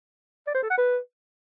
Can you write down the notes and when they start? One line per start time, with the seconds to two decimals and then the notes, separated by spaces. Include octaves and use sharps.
0.47 D5
0.55 C5
0.62 A4
0.70 F#5
0.78 B4